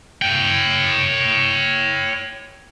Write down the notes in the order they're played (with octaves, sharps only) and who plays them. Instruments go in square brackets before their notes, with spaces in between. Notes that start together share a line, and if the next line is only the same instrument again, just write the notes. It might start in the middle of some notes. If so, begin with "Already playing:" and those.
[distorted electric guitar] C#5 G5